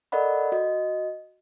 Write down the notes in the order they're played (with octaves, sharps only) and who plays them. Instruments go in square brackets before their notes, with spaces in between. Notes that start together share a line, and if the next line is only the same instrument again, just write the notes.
[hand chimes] A4 A#4 D5 D#5 F#5 B5
F#4 D#5